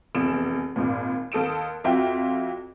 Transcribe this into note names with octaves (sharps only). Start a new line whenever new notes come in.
F1 E2 D7 E7
G#1 D#2 A#2
D#2 A4 D#6 D7 E7
F2 F4 F#4 E5 G5